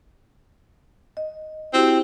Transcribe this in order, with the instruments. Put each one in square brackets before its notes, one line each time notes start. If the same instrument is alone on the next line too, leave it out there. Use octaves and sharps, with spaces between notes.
[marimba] D#5
[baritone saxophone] C4 [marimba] E4 F#4 G4